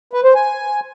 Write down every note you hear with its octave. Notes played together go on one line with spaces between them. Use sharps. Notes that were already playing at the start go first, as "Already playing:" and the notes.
B4
C5
G#5